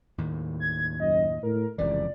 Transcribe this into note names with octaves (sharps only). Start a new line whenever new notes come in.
D#2 A2 D#3
G#6
F#2 D#5
A2 A#4
F1 C#2 C3 E3 D5